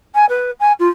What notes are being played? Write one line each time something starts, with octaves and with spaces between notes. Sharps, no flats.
G#5
B4
G#5
F4